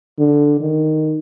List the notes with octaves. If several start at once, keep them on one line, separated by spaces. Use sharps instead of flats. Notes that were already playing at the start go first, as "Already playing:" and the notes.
D3
D#3